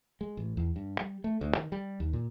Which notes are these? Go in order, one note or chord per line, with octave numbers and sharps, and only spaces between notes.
G#3
A1
E2
G2
G3
A3
D2
D#3
G3
D#2
A#2